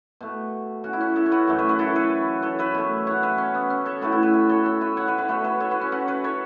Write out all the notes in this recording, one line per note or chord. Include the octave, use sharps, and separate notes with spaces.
B2 A3
C#4 F#4
E4
C#4
E4 A4
C#5
F#4 B4
F#2 E3 A3
B4 E5
F#4 B4
E4 A4
B4 E5
A4 C#5
B4 E5
B2 A3
C#5 F#5
B4 E5
C#4
B3
C#4
A4 C#5
A2 A3 F#4 B4
E4 A4
B4 E5
B4 E5
A4 C#5
A4 C#5
B4 E5
C#5 F#5
B4 E5
F#4 B4
B2 A3 A4 C#5
B4 E5
A4 C#5
F#4 B4
C#4
C#4 F#4
F#4 B4
A4 C#5